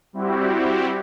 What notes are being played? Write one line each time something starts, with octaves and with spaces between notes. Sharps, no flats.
G3 C4 E4 F#4 G4